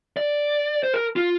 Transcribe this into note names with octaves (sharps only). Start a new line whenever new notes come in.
D5
C5
A#4
F4